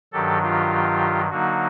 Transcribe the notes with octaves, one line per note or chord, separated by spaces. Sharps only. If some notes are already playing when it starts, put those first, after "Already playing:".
G2 D#3 F#3 G4 A4
F4 G4
D3 F#3 A#3 D#4 F#4